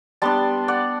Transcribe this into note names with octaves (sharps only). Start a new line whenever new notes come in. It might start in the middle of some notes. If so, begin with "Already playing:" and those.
G3 B3 D4 A5 C6
D5 F#5